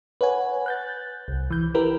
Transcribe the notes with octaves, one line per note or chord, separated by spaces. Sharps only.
B4 C#5 F#5 G#5
F#6 G6 A6
C2
E3 G6
E4 G4 A#4 B4